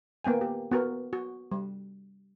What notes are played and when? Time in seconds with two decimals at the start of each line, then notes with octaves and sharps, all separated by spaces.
0.24 A#3 B3 G5 G#5
0.41 G4
0.71 B3 F#4 A#4
1.13 F#4
1.52 G3